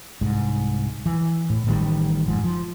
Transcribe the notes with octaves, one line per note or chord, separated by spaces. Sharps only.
C2 G#2
E3
A2
A1 D#3 G3
F#1 G#2 F3
F3